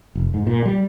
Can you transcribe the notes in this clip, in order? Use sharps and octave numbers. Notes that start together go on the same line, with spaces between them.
F1
G#2
A#2
G3